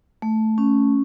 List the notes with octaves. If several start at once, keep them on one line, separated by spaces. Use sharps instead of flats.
A3
C#4